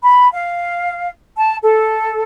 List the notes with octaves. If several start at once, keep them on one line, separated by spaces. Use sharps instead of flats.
B5
F5
A5
A4